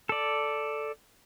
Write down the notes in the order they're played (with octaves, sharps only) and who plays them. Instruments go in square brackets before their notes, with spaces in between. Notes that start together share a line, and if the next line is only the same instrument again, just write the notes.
[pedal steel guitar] A4 D5